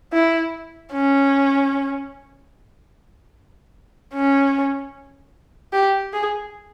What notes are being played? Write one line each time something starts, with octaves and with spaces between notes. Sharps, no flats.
E4
C#4
C#4
G4
G#4